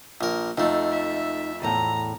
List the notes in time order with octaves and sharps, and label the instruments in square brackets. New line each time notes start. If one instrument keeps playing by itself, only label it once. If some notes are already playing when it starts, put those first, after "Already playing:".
[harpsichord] A#1 A#4
[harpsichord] F2 A3 [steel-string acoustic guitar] D#4
[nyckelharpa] E5
[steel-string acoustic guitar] E2 A2 [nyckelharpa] A#5